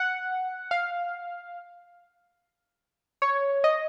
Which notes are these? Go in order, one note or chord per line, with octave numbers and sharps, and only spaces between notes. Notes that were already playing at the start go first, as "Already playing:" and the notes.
Already playing: F#5
F5
C#5
D#5